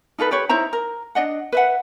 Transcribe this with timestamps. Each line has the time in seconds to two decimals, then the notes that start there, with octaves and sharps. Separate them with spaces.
0.18 D#4 F4 A4 B4
0.31 G4 B4 C#5
0.49 D#4 E4 C5 A#5
0.73 A#4
1.15 D4 D5 D#5 F#5
1.52 B4 E5 F#5